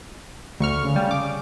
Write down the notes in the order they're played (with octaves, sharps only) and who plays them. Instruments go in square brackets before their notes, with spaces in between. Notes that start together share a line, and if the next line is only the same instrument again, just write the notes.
[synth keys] D2 C#6 F6
[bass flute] C#3
[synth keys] G3
D6